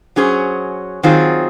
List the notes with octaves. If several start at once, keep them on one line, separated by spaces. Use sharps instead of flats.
F#3 C#4 G#4 C5
D#3 F#3 C4 F4 G#4